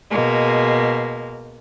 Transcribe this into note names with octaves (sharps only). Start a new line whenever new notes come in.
B2 G#3 A#3